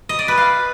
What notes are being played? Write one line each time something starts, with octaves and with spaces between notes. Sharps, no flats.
D#5
D5
B4
F5